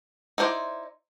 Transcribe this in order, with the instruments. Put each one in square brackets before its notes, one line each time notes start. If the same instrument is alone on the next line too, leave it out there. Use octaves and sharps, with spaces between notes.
[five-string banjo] D#4 E4 C5 D5